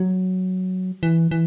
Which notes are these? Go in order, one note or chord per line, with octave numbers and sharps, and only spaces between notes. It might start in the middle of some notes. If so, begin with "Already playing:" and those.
Already playing: F#3
E3
E3